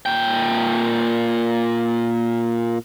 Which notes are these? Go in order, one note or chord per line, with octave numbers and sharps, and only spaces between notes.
A#2 G5